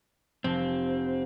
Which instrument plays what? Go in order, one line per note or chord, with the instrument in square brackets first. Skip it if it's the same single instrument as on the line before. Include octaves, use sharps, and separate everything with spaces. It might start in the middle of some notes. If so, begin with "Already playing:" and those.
[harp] F1 [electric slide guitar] C4